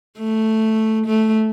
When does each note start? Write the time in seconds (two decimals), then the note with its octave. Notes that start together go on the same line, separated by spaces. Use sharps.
0.19 A3
1.06 A3